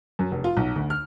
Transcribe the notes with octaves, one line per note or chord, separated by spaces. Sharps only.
F#2
F1
F4
B1
D2
F6